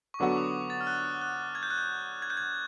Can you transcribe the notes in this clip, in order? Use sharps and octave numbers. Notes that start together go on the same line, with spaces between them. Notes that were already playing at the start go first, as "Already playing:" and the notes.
C#6
D3 F#3 B3 D4 F#4 D6
D6
D#6
A6
F6
F#6
F#6
G#6
G6
F#6
G6
G#6
G6
G#6